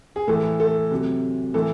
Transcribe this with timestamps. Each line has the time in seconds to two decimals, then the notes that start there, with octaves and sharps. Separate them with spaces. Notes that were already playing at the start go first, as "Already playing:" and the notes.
0.16 G#4
0.27 A2 E3 A4
0.60 A4
0.91 C3 F#3
1.54 A2 E3 A4